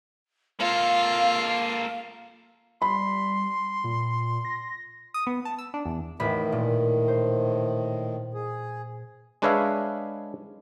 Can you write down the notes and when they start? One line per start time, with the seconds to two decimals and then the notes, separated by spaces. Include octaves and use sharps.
0.60 A#3 F4 A4 F5
2.82 G3 B5 C6
3.84 A#2
4.45 A#6
5.14 D#6
5.27 B3
5.45 A5
5.59 E6
5.74 D4
5.85 E2
6.20 A1 A2 D#3 B5
6.52 A#2
7.08 C5
8.34 G#4
9.42 G#3 D4 B4 C#5 E5 F5